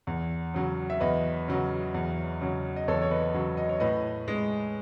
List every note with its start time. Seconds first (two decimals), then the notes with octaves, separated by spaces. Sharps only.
0.07 E2
0.54 C#3 F#3
0.90 E5
1.00 E2 B4 D#5
1.48 C#3 F#3
1.94 E2
2.41 C#3 F#3
2.76 D#5
2.88 E2 A4 C#5
3.02 C#5
3.11 B4 D#5
3.34 C#3 F#3
3.57 D#5
3.69 C#5
3.80 A2 B4 D#5
4.28 G#3